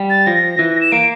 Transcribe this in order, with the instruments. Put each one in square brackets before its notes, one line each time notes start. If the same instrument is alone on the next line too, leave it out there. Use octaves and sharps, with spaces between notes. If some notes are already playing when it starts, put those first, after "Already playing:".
Already playing: [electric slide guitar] G3
[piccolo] A6
[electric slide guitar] F3 [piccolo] A#6
[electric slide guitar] E3
[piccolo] E7
[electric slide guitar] A#3 [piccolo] D7